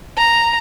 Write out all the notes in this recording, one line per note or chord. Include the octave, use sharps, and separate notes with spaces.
A#5